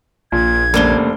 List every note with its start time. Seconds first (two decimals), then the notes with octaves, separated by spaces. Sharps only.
0.32 A#1 A#2 G#6
0.74 F1 C#3 A3 A#3 D4 G7